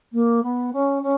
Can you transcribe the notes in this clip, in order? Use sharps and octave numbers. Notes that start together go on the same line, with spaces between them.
A#3
B3
C#4
C#4